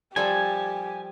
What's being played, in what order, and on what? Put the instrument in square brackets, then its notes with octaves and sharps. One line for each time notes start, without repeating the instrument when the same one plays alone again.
[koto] F3 G3 A4 [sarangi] G4 [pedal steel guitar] G#5